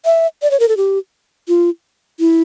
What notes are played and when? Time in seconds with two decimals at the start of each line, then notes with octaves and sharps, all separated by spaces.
0.05 E5
0.42 D5
0.51 C#5
0.60 A#4
0.69 A4
0.77 G4
1.48 F4
2.20 E4